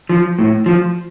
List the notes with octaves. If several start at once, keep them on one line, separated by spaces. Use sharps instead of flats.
F3
A2
F3